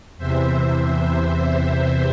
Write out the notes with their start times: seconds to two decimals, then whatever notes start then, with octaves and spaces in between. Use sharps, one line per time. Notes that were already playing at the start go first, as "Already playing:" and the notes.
0.17 E2 C3 E3 C5 E5